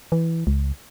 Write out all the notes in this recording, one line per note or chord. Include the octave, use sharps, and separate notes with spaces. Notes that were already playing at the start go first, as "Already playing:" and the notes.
E3
C#2